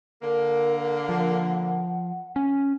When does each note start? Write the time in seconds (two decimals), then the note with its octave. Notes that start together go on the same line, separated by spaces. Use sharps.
0.22 D3 A#3 A#4
1.09 F3 F#5
2.36 C#4